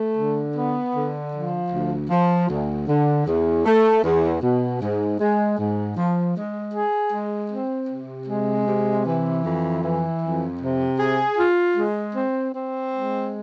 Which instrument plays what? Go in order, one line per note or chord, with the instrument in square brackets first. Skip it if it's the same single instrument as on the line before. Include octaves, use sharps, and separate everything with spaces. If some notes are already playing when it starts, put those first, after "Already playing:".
Already playing: [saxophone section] A3
D3
B3
D3
F3
D2
F3
D2
D3
E2
A3
E2
B2
G#2
G#3
G#2
F3
G#3
G#4
G#3
C4
C3
G#3
C3
E3
F2
E3
F2
C3
G#4
F4
G#3
C4
C4
G#3